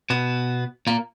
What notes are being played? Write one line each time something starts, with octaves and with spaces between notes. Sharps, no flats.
B2 B3
A#2 A#3